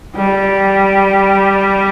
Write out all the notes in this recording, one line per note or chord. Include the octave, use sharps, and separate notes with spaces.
G3